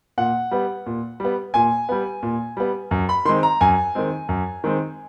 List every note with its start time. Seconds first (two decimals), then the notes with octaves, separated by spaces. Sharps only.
0.18 A#2 F#5
0.51 G3 B3
0.86 A#2
1.20 G3 B3
1.54 A#2 G#5
1.89 G3 B3
2.23 A#2
2.57 G3 B3
2.91 F#2
3.09 B5
3.25 D#3 G#3 C4 C6
3.43 A#5
3.61 F#2 G#5
3.95 D#3 G#3 C4
4.29 F#2
4.64 D#3 G#3 C4